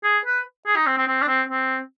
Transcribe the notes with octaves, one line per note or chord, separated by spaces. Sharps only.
G#4
B4
G#4
D#4
C4
C4
C4
D4
C4
C4